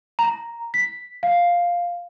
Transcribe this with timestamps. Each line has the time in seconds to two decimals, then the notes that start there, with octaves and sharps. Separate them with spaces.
0.19 A#5
0.74 B6
1.23 F5